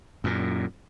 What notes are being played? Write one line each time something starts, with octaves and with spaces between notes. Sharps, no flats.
F#2 A#2